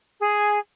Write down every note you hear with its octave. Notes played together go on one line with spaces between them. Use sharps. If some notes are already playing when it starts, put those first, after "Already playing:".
G#4